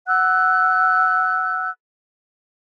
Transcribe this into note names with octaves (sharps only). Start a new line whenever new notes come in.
F#5 E6 F#6